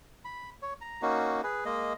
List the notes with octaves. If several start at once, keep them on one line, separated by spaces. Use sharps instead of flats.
B5
C#5
A#5
A#3 C#4 D#4 F#4
G#4 B4
G#3 A#3 D#5